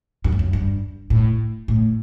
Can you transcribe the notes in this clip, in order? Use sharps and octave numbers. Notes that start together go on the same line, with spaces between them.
F#2
E2
F#2
G2
A2
A2